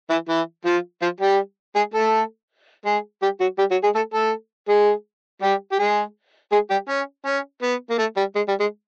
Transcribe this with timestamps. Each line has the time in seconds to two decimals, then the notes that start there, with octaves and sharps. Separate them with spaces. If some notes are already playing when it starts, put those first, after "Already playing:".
0.10 E3 E4
0.29 E3 E4
0.65 F3 F4
1.02 F3 F4
1.21 G3 G4
1.76 G#3 G#4
1.94 A3 A4
2.85 G#3 G#4
3.22 G3 G4
3.40 F#3 F#4
3.58 G3 G4
3.71 F#3 F#4
3.83 G#3 G#4
3.95 A3 A4
4.14 A3 A4
4.69 G#3 G#4
5.42 G3 G4
5.72 G4
5.79 G#3 G#4
6.52 G#3 G#4
6.70 G3 G4
6.89 C#4
7.26 C#4
7.63 B3
7.90 A#3
7.99 A3
8.17 G3
8.35 G#3
8.48 G3
8.60 G#3